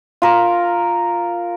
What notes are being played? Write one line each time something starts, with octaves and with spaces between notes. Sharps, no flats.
F4 A#4